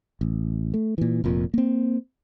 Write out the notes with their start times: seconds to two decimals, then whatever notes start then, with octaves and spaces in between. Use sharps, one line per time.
0.21 A1
0.74 A3
0.98 A#2 E3
1.24 F1 F2 A#2
1.54 A#3 C4